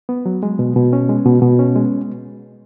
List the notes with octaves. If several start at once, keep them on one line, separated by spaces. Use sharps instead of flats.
B3
F#3
G#3
B2
B2
C#4
G#3
B2
B2
C#4
G#3